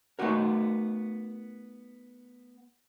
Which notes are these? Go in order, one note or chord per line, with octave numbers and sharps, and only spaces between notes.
A3 B3 C4 D#4 F#4 A#4